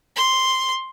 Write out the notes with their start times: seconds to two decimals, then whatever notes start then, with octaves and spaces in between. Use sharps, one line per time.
0.16 C6